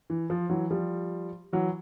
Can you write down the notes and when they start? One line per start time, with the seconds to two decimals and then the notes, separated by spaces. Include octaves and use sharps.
0.10 E3
0.30 F3
0.50 E3 F#3
0.71 F3 G3
1.53 E3 F#3